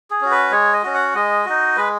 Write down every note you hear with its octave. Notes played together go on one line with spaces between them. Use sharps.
G#4
C#4 F#4
B4
G#3 C#5
D#5
C#4 F#4
F#5
G#3 D#5
D#4 F#4
G#3 B4